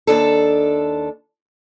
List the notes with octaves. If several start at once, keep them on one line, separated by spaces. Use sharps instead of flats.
D#2 D4 A4